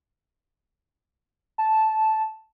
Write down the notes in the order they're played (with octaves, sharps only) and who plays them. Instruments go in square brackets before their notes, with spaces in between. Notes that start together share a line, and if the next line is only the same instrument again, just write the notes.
[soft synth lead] A5